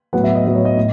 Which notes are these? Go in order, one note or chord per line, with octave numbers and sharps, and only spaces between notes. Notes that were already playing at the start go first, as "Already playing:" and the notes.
A2 F#3 B3 F#5
E5
D#5
A2 F#3 B3 D#5
C#5
D#5
A2